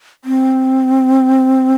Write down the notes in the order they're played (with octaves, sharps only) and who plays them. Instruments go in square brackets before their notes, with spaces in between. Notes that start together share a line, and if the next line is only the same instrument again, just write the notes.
[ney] C4